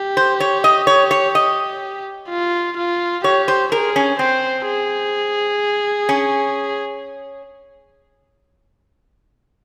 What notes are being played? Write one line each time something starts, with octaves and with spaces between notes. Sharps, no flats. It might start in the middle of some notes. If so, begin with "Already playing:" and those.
Already playing: G4
C5
C#5
D#5
C#5
C#5
D#5
F4
F4
G4 C#5
C5
G#4 A#4
C#4
C4 C5
G#4
C#4